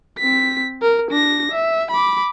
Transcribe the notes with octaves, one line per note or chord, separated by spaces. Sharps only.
C4 B6
A#4
D4 A#6
E5
B5 D6